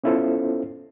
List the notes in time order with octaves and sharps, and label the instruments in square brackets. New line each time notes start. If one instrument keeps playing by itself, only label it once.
[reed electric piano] B3 C#4 E4 F4 A4 C5